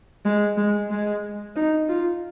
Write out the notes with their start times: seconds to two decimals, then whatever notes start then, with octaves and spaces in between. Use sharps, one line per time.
0.25 G#3
0.57 G#3
0.90 G#3
1.56 D#4
1.88 F4